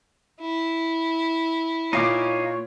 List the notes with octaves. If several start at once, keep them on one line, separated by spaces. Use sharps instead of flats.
E4
A#2 D#4 C#5 F5 D6